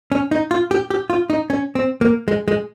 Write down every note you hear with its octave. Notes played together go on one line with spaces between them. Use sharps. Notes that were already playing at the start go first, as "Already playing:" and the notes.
C#4
D#4
F4
G4
G4
F4
D#4
C#4
C4
A#3
G#3
G#3